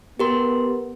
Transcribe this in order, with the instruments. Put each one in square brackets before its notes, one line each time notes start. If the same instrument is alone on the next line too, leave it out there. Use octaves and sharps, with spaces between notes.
[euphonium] B3 [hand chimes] G4 A#4 C6